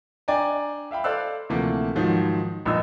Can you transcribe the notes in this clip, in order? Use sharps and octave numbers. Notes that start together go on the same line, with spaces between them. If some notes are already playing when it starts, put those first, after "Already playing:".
D4 D5 G5 G#5 A#5
E5 F5 G5 B5
A4 C5 D5 F5 E6 F#6
D2 C3 E3 F3 A3 A#3
G#2 D#3 F3 F#3
A#1 G2 D#4 D#5 E6